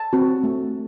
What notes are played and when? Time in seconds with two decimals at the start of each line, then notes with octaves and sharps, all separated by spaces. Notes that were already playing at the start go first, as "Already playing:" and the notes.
Already playing: A5
0.13 C4 F#4
0.44 A3